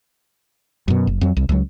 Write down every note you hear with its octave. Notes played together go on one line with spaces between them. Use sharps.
F#2 B2
F#1
F2 F#3
C2
C#2 F#3